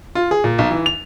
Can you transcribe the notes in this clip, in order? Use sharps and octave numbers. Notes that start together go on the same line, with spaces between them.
F4
G#4
A#2
B1
E3
F7